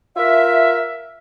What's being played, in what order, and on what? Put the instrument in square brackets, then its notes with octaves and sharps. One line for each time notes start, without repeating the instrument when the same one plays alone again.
[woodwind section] F4 A#4 E5